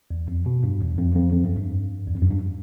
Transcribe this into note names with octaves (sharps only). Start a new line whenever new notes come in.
E2
F2
B2
G2
E2
F2
F2
F2
F#2
G2
E2
F2
F#2
G2